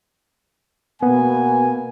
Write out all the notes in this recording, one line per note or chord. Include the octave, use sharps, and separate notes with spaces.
B2 A#3 B3 G#5